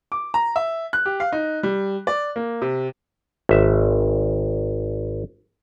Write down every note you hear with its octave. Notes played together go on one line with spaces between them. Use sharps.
D6
A#5
E5
F#6
G4
F5
D#4
G3
D5
A#3
C3
G#1 E5